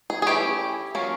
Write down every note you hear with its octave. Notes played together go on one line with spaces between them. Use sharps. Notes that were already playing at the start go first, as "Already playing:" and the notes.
G#4
G#4
E3 A3 C#4 E4 G4
F#3 A#3 C#4 F4